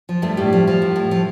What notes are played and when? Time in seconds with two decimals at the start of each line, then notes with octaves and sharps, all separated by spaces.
0.09 F3
0.22 G2 A3
0.37 A2 G3
0.53 F3
0.67 F3
0.82 A2
0.96 A2
1.11 F3